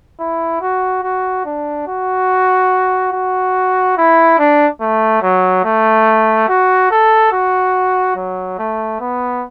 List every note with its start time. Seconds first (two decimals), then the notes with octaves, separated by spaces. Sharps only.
0.20 E4
0.61 F#4
1.03 F#4
1.45 D4
1.88 F#4
3.13 F#4
3.98 E4
4.39 D4
4.81 A3
5.23 F#3
5.65 A3
6.49 F#4
6.91 A4
7.33 F#4
8.16 F#3
8.59 A3
9.00 B3